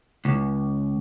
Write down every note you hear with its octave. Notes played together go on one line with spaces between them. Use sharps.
C#2